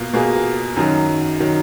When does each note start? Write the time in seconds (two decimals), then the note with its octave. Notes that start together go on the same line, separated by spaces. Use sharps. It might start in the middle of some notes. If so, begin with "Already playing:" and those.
Already playing: B2 A#3 F4
0.13 B2 A#3 F4 G#4
0.76 F#2 D#3 F#3
1.40 D#3 F#3